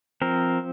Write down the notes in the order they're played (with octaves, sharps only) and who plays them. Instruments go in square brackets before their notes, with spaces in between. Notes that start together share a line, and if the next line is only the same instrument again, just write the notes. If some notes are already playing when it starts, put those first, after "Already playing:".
[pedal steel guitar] F3 C4 A#4